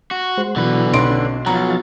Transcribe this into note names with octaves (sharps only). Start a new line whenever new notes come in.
F#4
G#3 C5
B2 D3 E3 F#3 B4
B1 C#4 C6 D7
B2 F3 F#3 F5 A#5 A6